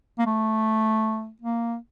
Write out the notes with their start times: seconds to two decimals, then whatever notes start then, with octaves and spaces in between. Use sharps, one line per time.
0.19 A#3
0.26 A3
1.42 A#3